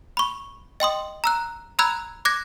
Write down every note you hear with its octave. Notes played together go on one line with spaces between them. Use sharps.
B5 C#6
D#5 G5 C6 D#6
A#5 E6 F#6
A#5 B5 E6 F#6 G#6
D6 F#6 G#6 A#6